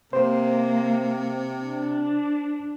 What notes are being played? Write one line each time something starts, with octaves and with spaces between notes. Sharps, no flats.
C3 A#3 C5
D4